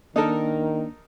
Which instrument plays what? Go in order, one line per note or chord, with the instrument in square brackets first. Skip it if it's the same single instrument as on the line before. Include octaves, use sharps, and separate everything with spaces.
[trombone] D#3 [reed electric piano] A#3 D4 [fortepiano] D#4 A4 A#4